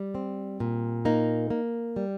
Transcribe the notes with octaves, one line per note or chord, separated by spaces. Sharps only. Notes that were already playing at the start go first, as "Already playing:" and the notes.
Already playing: G3
C4
A#2
A#3 D#4
A#3
G3